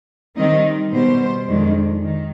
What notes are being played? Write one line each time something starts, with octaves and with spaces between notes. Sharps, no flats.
D#3 G3 C4 D#4 D#5
B2 G3 B3 C5
F2 D#3 G#3 D4
D#3